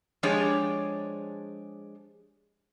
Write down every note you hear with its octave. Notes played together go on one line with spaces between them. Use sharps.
F3 G#3 D4 G4 G#4 C#5